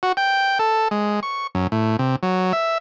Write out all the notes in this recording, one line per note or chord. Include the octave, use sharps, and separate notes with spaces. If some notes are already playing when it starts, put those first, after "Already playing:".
F#4
G5
A4
G#3
C#6
F#2
A2
C3
F#3
E5